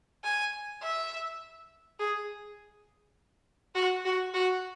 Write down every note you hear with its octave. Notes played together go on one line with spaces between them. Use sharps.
G#5
E5
G#4
F#4
F#4
F#4